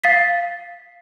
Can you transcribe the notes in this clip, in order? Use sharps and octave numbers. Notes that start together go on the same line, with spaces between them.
F5 A6 B6